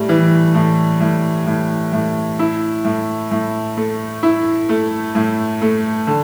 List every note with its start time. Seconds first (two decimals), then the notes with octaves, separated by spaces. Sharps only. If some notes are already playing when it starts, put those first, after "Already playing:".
Already playing: A2 G3
0.09 E3
0.55 A2
1.00 A2
1.46 A2
1.93 A2
2.39 E4
2.85 A2
3.31 A2
3.77 A3
4.23 E4
4.69 A3
5.15 A2
5.62 A3
6.07 D3